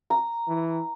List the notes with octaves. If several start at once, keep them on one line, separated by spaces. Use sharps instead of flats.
A#5
E3